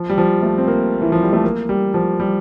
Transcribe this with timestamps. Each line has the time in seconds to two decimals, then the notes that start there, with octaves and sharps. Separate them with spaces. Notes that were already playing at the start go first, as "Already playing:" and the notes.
Already playing: F3
0.09 G3
0.18 F3
0.43 A3
0.58 C4
0.68 A#3
1.02 E3
1.12 F3
1.23 G3
1.33 A3
1.44 A#3
1.69 G3
1.94 F3
2.20 G3